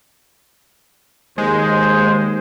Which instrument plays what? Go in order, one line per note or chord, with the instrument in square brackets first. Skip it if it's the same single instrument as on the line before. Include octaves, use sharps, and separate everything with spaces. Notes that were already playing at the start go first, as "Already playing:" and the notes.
[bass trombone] D#2 [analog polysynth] G#3 [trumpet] C5